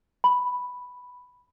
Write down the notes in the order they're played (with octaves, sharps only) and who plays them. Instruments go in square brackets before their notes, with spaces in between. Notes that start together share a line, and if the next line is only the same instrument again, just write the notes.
[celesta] B5